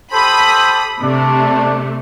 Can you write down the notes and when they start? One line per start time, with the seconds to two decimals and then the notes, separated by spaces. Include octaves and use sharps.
0.12 G4 A4 C5 B5 D#6
1.02 C3 A3 D4